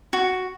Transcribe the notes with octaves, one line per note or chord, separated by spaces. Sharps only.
F#4